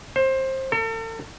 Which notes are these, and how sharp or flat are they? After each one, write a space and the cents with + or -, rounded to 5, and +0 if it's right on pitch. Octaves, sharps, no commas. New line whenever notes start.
C5 +20
A4 +40